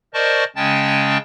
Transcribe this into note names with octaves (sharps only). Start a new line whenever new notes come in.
A#4 C5 D5 D#5 A5 C#6
C#3 G#3 C#4 G5 A5 A6